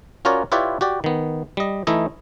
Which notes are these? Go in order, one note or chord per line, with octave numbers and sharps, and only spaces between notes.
C#4 F4 F#4 A#4 C#5 D5
E4 F4 G4 B4 C#5 D5
F#4 G4 D5
D#3 B3
G3 D#5
E3 A3 D#4 E4 D#5